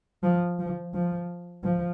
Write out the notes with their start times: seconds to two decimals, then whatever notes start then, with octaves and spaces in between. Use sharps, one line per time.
0.23 F3
0.59 F3
0.94 F3
1.64 F3